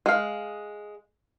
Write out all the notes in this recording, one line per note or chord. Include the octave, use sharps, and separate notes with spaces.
G#3 F5